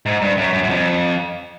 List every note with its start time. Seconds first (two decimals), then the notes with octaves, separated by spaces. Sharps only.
0.06 G#2
0.21 G2
0.37 F#2
0.53 F#2
0.63 F#2
0.69 F2